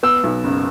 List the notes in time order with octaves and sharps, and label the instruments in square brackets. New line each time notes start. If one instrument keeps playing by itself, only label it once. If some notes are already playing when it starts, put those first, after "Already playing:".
[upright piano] B3 [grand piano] E6
[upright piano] B1
F#1